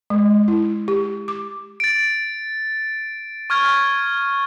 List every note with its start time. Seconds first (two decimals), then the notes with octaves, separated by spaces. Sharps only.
0.10 G#3
0.48 E4
0.88 G4
1.28 D6
1.80 A6 D7
3.50 C#6 F6 G#6